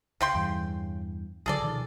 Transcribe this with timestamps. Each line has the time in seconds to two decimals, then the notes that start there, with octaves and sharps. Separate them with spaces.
0.21 C#2 C#3 G5 C6
0.35 E2 G2 E3
1.46 C#2 D3 F#3 G#4 A4 D5
1.62 B2 D#3 F3